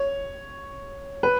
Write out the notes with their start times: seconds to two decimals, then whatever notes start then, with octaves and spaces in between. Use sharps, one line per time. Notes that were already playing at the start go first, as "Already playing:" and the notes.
Already playing: C#5
1.23 B4